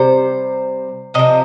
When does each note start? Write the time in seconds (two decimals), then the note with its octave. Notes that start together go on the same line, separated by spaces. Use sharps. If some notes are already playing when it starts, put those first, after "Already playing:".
Already playing: C3 G3 C5
1.14 C3 F3 D#5